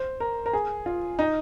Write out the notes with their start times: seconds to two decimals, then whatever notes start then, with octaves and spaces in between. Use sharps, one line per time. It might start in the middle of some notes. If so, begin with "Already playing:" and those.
Already playing: C5
0.20 A#4
0.46 A#4
0.53 G#4
0.86 F4
1.19 D#4